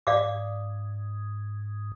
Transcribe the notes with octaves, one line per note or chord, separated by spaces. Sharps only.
G#2 D5 F5 D6